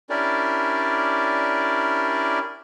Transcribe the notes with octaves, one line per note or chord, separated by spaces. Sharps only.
C#4 D4 E4 G4 A#4 D5